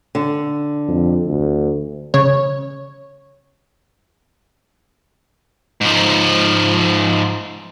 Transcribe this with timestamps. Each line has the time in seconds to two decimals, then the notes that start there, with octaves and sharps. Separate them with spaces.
0.15 D3
0.88 F2
1.26 D2
2.14 C#3 C#5
5.81 G#2 F3